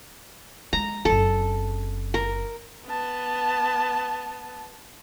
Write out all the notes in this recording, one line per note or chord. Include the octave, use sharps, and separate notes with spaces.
G#3 A#5
F#1 C4 A4
A#4
B3 A5